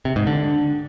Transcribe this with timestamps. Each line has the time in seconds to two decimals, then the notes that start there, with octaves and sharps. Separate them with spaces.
0.05 C3
0.16 G#2
0.27 D3